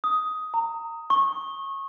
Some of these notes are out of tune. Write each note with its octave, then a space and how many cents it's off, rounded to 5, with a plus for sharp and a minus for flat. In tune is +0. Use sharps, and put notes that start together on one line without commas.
D#6 +10
A#5 -25
C#6 -25